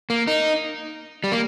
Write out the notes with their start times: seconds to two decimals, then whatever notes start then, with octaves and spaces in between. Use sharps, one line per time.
0.10 A#3
0.27 D#4
1.24 G3
1.32 A#3